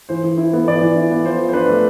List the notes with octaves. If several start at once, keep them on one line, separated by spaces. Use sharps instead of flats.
E3 C5
E3
E4
B3
E3 D5
E3
E4
B3
F3 C5
F3
C5
D4 B4
A3